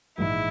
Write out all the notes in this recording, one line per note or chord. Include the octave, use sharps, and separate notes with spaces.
A#1 G#2 E3 E4